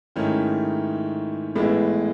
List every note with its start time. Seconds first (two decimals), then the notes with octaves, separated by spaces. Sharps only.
0.16 G#2 D#3 A3 C#4 E4
1.55 A1 A2 G#3 B3 E4